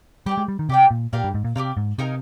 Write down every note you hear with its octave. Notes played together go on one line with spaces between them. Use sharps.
G3 G4 D5 G5
G#3
G3
D#3
C3 G4 D5 G5
A#2
A#2 G4 A#4 D5 F5
G2
G#2
A#2
C3 G4 A#4 D5 F5
G#2
C3 D#4 A#4 F5 G#5